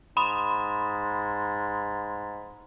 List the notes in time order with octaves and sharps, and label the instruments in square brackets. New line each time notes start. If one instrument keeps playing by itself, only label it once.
[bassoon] G#2 [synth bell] B5 C6 D#6